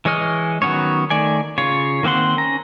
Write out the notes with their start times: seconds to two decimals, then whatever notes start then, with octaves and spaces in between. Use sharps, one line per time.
0.05 E3 G#3 C#5 D#5 F6
0.62 D#3 F#3 B3 C#4 C#5
1.10 D#3 A3 D5 G#5
1.58 C#3 F4 C#5
2.03 D#3 A#3 C4 F#5 C6
2.37 C#4 A#5